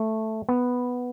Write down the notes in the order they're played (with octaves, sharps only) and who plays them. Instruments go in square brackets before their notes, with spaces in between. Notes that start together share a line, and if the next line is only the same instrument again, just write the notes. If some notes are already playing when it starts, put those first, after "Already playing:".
Already playing: [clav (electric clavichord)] A3
B3